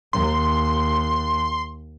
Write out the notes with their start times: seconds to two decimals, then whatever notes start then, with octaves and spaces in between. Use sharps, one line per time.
0.13 D#2 C6